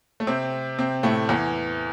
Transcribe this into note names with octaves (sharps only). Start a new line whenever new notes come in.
A3
C3 C4
C3 C4
A2 A3
E2 E3